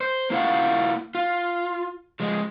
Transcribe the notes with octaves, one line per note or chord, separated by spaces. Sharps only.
C5
A#3 E4 F4 F5 F#5
F4
F3 G#3